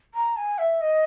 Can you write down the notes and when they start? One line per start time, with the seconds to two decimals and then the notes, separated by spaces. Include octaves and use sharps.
0.14 A#5
0.37 G#5
0.58 E5
0.81 D#5